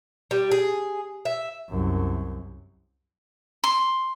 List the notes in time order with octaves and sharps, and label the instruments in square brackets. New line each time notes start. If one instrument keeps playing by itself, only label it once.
[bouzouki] G3
G#4
E5
[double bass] C2 F#2
[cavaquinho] C6